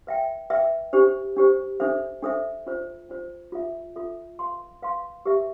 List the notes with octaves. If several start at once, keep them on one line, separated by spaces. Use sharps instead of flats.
B4 E5 G5
B4 E5 G5
D4 G4 C5
D4 G4 C5
D4 A4 C5 E5
D4 A4 C5 E5
D4 F4 C5
D4 F4 C5
F4 A4 E5
F4 A4 E5
B4 F5 C6
B4 F5 C6
G4 B4 E5